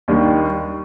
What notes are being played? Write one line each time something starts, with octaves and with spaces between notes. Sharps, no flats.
D#2 D#3 G3 D4